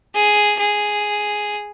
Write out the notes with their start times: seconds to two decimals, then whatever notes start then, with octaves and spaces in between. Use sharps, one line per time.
0.15 G#4
0.59 G#4